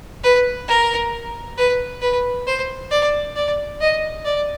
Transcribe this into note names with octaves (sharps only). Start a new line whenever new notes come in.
B4
A#4
B4
B4
C5
D5
D5
D#5
D5